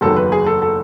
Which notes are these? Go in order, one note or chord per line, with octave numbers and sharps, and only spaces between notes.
F#1 E2 D#3 F#3 A4
B4
G#4
A4
A4